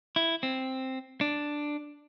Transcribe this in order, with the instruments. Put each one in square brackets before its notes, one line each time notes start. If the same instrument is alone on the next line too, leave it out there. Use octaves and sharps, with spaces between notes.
[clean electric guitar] E4
C4
D4